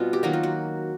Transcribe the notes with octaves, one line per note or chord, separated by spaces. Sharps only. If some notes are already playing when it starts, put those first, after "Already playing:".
Already playing: B2 G3 C4 F4
G4
D#3 F#3 A#3 D#4 F#4
F4
F#4